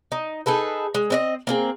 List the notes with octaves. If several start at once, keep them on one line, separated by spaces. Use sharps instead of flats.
D#4
D#4 G#4 A4 B4
G#3
C4 D4 D#5
A#3 C4 G#4